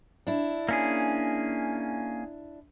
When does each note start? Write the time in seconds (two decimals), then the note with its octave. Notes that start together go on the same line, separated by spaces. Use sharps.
0.27 D4 E4
0.69 A#3 C#4 G#4